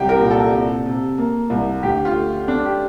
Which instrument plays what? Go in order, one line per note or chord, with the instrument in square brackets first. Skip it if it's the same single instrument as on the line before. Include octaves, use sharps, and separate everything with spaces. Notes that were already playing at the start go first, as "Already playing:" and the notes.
Already playing: [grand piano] C2 [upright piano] G4
[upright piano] A#4
[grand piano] A#2
[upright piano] A4
[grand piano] C3
C3
A#3
C2
[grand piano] D2 [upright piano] G4
[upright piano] F4
[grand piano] A3
[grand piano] A3 [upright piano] D4
[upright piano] G4